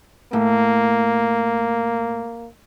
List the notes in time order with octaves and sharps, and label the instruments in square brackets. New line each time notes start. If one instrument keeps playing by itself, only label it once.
[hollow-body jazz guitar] A2 [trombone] A#3